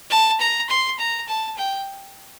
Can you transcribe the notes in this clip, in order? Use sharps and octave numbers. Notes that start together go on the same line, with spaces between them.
A5
A#5
C6
A#5
A5
G5